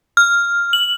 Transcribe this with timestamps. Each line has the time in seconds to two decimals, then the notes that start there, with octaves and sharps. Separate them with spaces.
0.17 F6
0.73 F#7